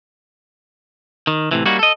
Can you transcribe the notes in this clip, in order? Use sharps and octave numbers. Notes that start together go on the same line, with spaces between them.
D#3
A2 C3 E3
G3 A#3 C#4 D#4 F#4
A4 D#5